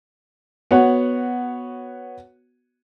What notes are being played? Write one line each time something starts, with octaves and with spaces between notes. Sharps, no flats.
B3 F#4 C#5 F#5